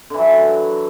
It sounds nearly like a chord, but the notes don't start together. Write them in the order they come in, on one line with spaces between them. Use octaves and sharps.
D3 E3 F#3